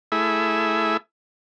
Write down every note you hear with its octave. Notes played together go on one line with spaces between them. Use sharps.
A3 E4 G#4 E5